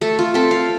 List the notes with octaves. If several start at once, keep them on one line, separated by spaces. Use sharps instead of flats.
A3 A4
F4
C4 A4
F5